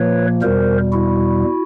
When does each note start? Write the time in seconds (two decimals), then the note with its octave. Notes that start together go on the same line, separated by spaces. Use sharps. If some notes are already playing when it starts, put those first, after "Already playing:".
Already playing: A#2 F3 A#3 B4 C#5
0.42 E2 B2 G3 A#4 C5
0.93 E4 F#4